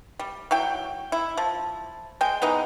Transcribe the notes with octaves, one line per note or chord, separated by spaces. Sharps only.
G3
F#3 E4 G5
E4
F3
G#3 G5
E3 G#3 B3 D#4